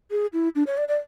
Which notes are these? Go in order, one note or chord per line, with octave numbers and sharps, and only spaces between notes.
G#4
E4
D4
C#5
D5
D5